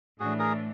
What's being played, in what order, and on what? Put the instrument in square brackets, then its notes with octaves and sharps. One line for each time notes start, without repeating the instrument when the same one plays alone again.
[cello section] A2 E3 A3 D4 [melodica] F#4 G#4
[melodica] G#4 A#4